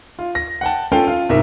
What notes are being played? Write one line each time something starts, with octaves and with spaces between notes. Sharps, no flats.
F4
A#6
F#5 G5 A5
C#4 F4 A4 F5 G5 A5
F4
C2 G#2 A#4 E5